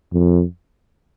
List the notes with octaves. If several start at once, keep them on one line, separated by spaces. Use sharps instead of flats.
F2